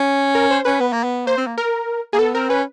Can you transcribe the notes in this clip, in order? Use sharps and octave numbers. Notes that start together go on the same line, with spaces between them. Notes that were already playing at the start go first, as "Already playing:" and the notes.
Already playing: C#4
A#4
C5
C#4 B4
B3
A#3
B3
A#3 C5
C4
A#3
A#4
A#3 G#4
B3 A4
C4 A#4
C#4 B4